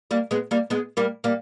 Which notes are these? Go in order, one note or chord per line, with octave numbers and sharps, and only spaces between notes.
G3 A#3
G#3 B3
G3 A#3
G#3 B3
G3 A#3
G3 A#3